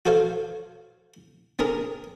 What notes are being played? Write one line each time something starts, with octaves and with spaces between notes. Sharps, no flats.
F#4 A4 C5 C#5 F5
C4 D4 G#4 A#4